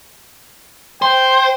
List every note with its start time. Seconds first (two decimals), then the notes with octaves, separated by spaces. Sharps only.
1.02 C5 G5